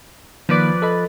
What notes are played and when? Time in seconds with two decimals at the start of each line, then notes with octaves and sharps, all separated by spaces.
0.49 D#3 F3 A#3 B4 D5
0.82 A4 D#5 B5